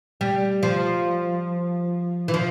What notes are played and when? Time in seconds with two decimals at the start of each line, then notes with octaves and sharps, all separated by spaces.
0.21 G3
0.63 F3
2.28 E3
2.34 F3